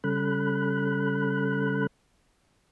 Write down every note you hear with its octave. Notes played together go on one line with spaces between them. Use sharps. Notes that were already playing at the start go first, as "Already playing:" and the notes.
C#3 G3 C#4 A4 B5 F#6